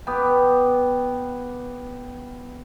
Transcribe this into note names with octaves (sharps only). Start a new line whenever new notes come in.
B3 G4